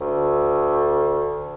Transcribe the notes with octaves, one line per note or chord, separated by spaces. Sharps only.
D2